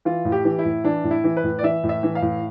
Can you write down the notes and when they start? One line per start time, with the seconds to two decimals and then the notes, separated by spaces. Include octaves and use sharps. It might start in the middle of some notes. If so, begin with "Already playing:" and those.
0.05 E3 F4
0.25 A2
0.32 G4
0.45 E3
0.59 E4
0.65 A2
0.84 E3 D4
1.04 A2
1.11 E4
1.24 E3
1.37 B4
1.44 A2
1.59 D5
1.63 E3 E5
1.84 A2
1.89 E5
2.03 E3
2.15 F5
2.22 A2